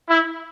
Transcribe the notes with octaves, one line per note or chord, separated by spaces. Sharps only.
E4